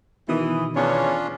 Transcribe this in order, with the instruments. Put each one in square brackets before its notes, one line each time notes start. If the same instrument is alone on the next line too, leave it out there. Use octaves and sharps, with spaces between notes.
[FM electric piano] B2 D#3 D#6 [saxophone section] E3
[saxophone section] E2 C#5 [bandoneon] C#4 D4 F4